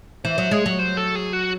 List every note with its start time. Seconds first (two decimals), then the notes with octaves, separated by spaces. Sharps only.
0.25 E3 C5
0.38 F#3
0.51 G#3 C#5
0.66 F#3
0.79 C5
0.97 A4
1.15 G#4
1.33 F#4